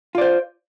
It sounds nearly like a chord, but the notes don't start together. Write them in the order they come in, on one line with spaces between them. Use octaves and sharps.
F4 D5 C5